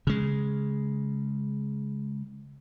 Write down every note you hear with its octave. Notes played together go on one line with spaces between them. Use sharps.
C#3 G#3